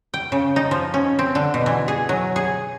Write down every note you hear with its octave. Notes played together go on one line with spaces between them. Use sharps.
G5
C#3
D#4
F3
C#4
C4
D3
B2
E3
G#4
F#3
G#4